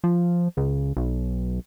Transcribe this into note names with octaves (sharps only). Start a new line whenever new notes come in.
F3
C#2
B1